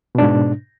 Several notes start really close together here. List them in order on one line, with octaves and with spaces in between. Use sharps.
B2 D4 G#2